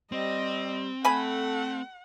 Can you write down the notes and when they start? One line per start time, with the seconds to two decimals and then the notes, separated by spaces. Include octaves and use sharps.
0.12 G3 C4 D#5
1.05 A3 A4 F#5 G#5 B5